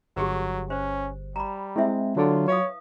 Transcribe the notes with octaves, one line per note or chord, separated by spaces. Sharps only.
G1 F#3 G4 G#4 B4
C#4 C5
G3 A#5 B5
G#3 C4 E4 E5
D3 F#3 F4
B4 C#5 F5 D#6